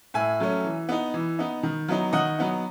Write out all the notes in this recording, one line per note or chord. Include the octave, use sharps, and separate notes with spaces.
A2 E5 G#5
F#3 A3 C#4
E3
B3 D#4
E3
B3 D#4
D#3
F#3 B3 D#4
D#3 D#5 F#5
F#3 B3 D#4